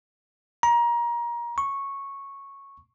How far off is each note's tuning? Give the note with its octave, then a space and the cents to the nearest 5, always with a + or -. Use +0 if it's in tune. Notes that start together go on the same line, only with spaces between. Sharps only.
A#5 +25
C#6 -10